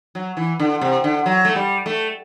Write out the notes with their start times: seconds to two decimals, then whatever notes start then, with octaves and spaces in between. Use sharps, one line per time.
0.15 F#3
0.37 E3
0.60 D3
0.81 C3
1.04 D3
1.26 F#3
1.45 A3
1.56 G3
1.86 A3